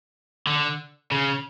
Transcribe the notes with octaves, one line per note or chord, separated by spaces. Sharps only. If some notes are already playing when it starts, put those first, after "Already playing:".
D3
C#3